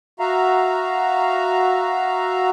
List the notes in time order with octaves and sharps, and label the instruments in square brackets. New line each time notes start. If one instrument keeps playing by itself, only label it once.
[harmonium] F#4 E5 F5 A#5